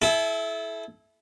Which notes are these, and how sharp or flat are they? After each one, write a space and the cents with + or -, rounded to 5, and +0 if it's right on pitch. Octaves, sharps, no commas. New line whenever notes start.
E4 +0 A4 -35